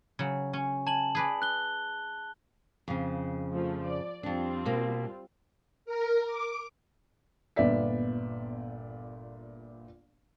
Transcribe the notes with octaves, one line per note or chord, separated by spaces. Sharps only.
C#3 F#3
C#4
G#5 A5 F#7
G#4 B4 D5
F#6 G7
F2 C#3
F3 A3
D5
F2 G3 C4 D4 F4
B2 A#3
A#4
D6
G1 A#2 B3 D5 E5 B6